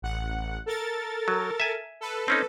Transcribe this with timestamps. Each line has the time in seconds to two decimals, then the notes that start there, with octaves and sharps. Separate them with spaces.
0.02 A1 F#5
0.66 A4 A#4 A6
1.28 F#3
1.60 E5 G#5
2.01 A4 B4
2.28 C4 C#4 D#4